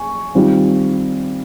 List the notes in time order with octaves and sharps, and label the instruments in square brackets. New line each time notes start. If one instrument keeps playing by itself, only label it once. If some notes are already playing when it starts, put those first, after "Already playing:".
Already playing: [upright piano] G#5 C#6
D#3 G3 C4 F4